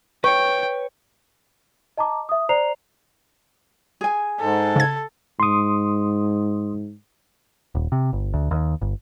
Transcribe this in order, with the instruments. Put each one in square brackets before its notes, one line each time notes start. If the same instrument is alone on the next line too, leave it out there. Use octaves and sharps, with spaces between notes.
[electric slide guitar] B4 C#5 [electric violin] G5 [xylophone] C#6
[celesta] D#5 A5 A#5 D6
E5 D#6
C5 D5 A#5 C7 F7
[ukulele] G#4 G#5
[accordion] G#2 [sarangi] A4
[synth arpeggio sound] C#3 G#6
[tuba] G#2 [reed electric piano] C6 D#6
[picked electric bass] D#1
C3
G1
D2
D#2
G1